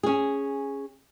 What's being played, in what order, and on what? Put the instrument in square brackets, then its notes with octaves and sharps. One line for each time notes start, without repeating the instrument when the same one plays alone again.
[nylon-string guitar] C#4 G#4